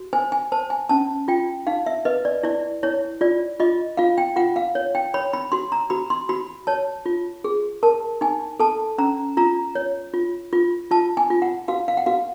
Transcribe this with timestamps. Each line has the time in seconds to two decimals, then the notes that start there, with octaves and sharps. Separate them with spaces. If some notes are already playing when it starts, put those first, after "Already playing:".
Already playing: F#4
0.13 C5 G#5
0.32 G#5
0.52 C5 A5
0.70 G#5
0.89 C#4 A5
1.28 F4 G5
1.67 D#4 F5
1.86 E5
2.05 B4 D#5
2.25 D5
2.43 E4 D5
2.83 E4 C#5
3.21 F4 D5
3.60 F4 D#5
3.97 F4 F5
4.18 G5
4.36 F4 F#5
4.56 F5
4.75 C#5
4.95 G5
5.14 C#5 B5
5.33 B5
5.52 F#4 C6
5.72 A#5
5.90 F#4 B5
6.10 C6
6.29 F#4 B5
6.67 C#5 A5
7.06 F4
7.44 G#4
7.83 A#4 A5
8.21 D#4 G#5
8.60 A4 A5
8.98 C#4 A#5
9.37 F4 A#5
9.75 C#5
10.14 F4
10.53 F4
10.91 F4 A5
11.17 G#5
11.30 F4
11.42 F#5
11.68 F#4 F5
11.88 F5
11.97 F#5
12.06 F#4 F5